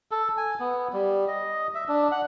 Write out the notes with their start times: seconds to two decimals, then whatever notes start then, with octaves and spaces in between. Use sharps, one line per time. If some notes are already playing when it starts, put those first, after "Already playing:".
0.11 A4
0.37 G#5
0.60 B3
0.93 G3
1.28 D#5
1.75 E5
1.88 D4
2.12 F#5